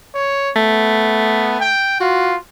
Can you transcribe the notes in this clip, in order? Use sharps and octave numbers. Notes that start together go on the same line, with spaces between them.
C#5
A3 B3
G5
F4 F#4